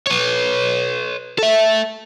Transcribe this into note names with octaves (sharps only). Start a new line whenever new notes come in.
B4 C#5
A4 E5